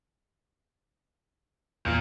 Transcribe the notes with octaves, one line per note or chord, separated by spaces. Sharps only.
E2 A#2